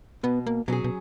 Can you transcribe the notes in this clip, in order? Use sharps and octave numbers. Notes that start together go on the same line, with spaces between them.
B2 B3
A#3
B2 F#3 C#4 G#4
B2